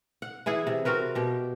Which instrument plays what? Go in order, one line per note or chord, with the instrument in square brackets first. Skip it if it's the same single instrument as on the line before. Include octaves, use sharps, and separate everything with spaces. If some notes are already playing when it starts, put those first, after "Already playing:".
[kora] F#5
E3 E4 G#4 F#5
C3
C4 F#4 A#4 B4
B2 G4